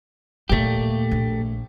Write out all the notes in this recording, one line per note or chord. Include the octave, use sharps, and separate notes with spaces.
D#2 A#2 A3 G4
A#1